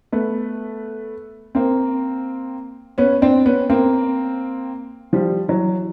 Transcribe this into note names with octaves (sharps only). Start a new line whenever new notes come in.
A3 B3
A#3 C4
B3 C#4
C4 D4
B3 C#4
A#3 C4
F3 G3
E3 F#3